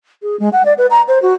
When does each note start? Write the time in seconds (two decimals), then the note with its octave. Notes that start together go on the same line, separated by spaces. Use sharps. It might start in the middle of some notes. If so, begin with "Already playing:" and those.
0.22 G#4
0.40 G#3
0.53 F#5
0.65 D5
0.78 B4
0.91 A#5
1.08 C5
1.22 F#4